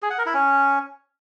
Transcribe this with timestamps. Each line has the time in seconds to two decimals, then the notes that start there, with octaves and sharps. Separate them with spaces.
0.02 G#4
0.10 F#5
0.18 A#4
0.26 E4
0.34 C#4